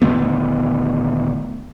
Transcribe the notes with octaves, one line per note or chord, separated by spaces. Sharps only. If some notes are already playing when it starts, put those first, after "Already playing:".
D#1 D3 A3 B3